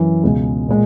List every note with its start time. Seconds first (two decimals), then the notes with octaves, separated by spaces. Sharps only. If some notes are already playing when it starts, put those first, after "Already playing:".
Already playing: F#2 E3
0.23 C#2 B2 G#3
0.68 A#2 G#3